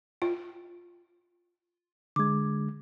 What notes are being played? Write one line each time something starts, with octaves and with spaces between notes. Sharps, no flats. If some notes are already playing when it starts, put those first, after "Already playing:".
F4
D3 G#3 D6 G#6